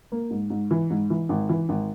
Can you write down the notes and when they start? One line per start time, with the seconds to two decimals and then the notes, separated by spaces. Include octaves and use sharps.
0.12 A#3
0.31 G#2
0.50 G#2
0.71 E3
0.90 G#2
1.10 E3
1.29 G#1
1.49 E3
1.69 G#1